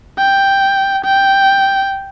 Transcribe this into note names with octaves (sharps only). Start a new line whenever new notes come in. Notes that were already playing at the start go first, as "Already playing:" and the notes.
G5
G5